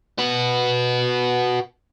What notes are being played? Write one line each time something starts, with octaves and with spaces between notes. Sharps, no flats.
F#4 B4